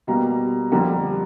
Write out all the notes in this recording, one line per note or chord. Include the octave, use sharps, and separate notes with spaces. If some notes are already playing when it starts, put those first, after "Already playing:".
B2 G3 A#3 A#5
F2 D3 G3 A#3 A#5